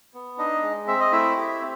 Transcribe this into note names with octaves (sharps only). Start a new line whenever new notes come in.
B3
D4 D#4 D#5
G#3
C4 E5
D#5
A3 E4 E5
G4
C4